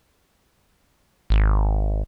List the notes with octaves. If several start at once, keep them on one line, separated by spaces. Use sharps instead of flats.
G#1